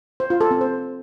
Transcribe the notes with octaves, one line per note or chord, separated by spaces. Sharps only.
C5
F4
A4
C4
C5